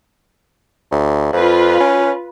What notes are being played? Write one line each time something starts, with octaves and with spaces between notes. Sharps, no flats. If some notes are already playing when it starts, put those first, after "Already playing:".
D2
F2 F4 B4
C#4